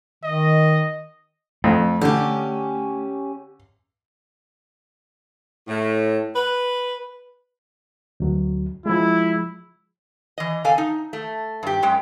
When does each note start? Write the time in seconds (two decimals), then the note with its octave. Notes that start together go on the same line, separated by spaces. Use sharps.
0.24 D#3 D#5
1.64 F2 A3
2.02 D3 C#4 G4
5.68 A2
6.35 B4
8.20 D2 F#3
8.86 F3 G#3 E4
10.38 E3 D#5
10.64 C3 A4 F5 G#5
10.78 D#4
11.13 A3
11.63 G2 G4
11.82 F#2 G#3 G5